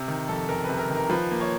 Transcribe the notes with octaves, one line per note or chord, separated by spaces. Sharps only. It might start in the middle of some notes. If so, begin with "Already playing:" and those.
Already playing: C3
D#3
F2 A4
F#1 A#4
B4
C3
A#4
D#3
A#4
F3 B4
A#3
C#5